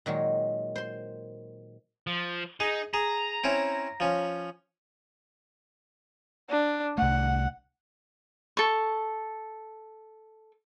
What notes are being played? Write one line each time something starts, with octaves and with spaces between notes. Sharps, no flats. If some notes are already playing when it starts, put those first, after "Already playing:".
A#2 D#3 F#3 G#3
C5 C6
F3
D#4 G#4
G#4 A#5
C4 C#4 E4
F3 C#4
D4
C2 A3 F#5
A4 C#6